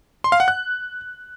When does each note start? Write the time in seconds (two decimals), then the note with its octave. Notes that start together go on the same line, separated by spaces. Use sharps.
0.24 C6
0.32 F5
0.40 F#5
0.48 F#6